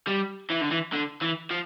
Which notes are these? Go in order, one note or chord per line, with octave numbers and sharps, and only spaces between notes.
G3
E3
D3
E3
D3
E3
F3